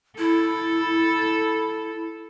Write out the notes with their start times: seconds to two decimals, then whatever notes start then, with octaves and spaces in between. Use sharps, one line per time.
0.18 E4 A4